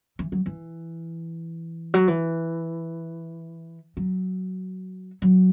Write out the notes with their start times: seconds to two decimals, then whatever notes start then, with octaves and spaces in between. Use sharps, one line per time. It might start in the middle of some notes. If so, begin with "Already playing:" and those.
0.19 E3
0.32 F#3
0.46 E3
1.94 F#3
2.08 E3
3.97 F#3
5.22 F#3